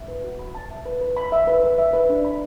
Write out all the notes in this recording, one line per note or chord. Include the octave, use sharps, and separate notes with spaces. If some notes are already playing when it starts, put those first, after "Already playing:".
Already playing: E5
B4
F#4
B5
A5
E5
B4
B4
B5
E5
B4
B4
E5
B4
D4
B5